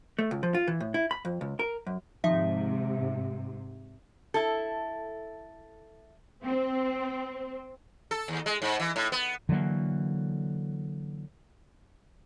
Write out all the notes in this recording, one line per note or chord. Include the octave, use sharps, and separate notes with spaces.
A3
C#2
F3
F4
E3
A2
E4
B5
F2
C#2
A#4
F#2
G#2 C3 D#3 F3 D#4 E5
E4 A4
C4
A4
D#2
G#3
G#2
E3
A2
B3
D3 E3 F#3 A#3